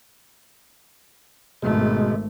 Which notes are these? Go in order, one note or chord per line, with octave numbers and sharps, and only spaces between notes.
G#1 B2 G#3 A3